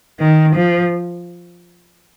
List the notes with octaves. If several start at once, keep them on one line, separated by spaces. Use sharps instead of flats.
D#3
F3